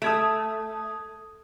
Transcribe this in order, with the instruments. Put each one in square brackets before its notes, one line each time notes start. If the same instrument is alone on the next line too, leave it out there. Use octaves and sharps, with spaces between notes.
[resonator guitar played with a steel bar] A3 [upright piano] D#6 G#6 E7